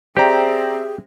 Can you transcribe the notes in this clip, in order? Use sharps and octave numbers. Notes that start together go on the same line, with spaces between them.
C4 G4 G#4 C5 D5 E5 A#5